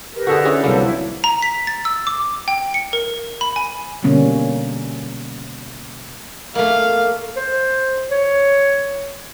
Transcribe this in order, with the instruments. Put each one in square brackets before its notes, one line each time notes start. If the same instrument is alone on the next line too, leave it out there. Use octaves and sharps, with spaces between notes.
[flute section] G4 A#4 B4
[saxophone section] D3 A4 [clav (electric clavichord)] F#4 G#4
[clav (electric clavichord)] C#4 E4 G#4
[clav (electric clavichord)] C2 F#3 A#3 [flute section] B4 C5
[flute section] E4
[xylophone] A#5
B6
A6
E6
D6
G5
C#7
A#4
B5
G#5
[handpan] B2 D3 G3 A#3 C#4
[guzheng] A3 A#3 [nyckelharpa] F5
[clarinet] C5
C#5